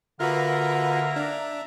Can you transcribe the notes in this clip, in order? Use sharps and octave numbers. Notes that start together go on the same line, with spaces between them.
D3 A#3 F4 F#4 A#4 B4 E5 A#5
D4